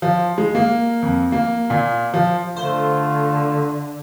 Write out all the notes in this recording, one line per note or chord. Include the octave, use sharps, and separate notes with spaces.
F3
G#3
A#3
F2
A#3
A#2
F3
D3 A3 F4 C5